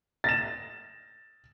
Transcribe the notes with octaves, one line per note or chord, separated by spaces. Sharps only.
A6 A#6 E7